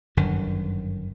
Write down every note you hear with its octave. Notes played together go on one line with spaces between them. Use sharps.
G1 F#2 D3 D#3